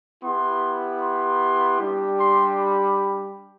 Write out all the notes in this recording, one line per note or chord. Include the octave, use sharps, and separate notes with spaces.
B3 E4 G4 C6
C6
G3 D4 G4
C6
B5